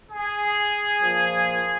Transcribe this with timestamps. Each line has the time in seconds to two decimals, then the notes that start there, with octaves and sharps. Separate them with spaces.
0.10 G#4
1.00 A#2 F3